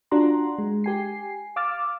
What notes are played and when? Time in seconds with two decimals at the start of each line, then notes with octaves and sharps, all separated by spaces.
0.11 D4 F4 F#4 F#5 A#5 C6
0.58 G#3
0.84 G4 G#5 C7
1.56 F5 D6 E6 F6 A6